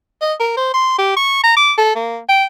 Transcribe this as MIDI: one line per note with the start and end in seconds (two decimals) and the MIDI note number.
0.21 0.33 75
0.40 0.53 70
0.57 0.73 72
0.74 0.95 84
0.98 1.14 67
1.16 1.40 85
1.43 1.52 82
1.57 1.72 86
1.78 1.95 69
1.95 2.18 58
2.29 2.44 79